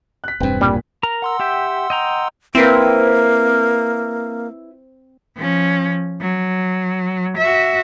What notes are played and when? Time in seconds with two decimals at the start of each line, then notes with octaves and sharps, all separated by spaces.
0.24 F#6 B6
0.40 E1 G2 C4 B4 G5
0.61 A#2 G3
1.03 A#4 A#5
1.22 F#5 C6 E6
1.40 G4 E5 G5
1.90 D#5 G5 A#5
2.55 A#3 C4 E4 B4
5.36 F3 C#4
6.21 F#3
7.38 F#4 E5